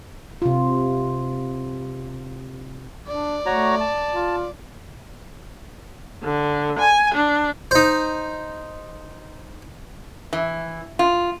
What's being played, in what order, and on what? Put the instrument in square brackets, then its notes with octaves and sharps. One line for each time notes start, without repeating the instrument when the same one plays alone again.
[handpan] C3 F4
[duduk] D4 [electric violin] D5
[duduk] A3 [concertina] F#4 C#5 A#5
[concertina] A5
[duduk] F4
[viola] D3
G#5
D4
[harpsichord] D#4 C5
[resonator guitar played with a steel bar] E3
F4